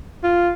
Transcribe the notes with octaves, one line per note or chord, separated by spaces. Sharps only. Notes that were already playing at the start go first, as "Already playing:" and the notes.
F4